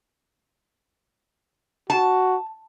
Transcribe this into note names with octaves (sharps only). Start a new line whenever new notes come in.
F#4 A5